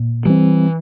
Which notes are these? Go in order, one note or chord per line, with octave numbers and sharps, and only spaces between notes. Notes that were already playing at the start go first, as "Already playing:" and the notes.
Already playing: A#2
E3 G3 C4